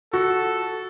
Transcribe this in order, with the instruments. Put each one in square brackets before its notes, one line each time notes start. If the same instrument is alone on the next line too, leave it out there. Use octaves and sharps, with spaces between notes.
[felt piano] F#4 [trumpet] A4